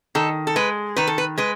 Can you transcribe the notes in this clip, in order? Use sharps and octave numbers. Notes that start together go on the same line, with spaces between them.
D#3 A4
A4
G#3 B4
D#3 B4
A4
B4
G#3 B4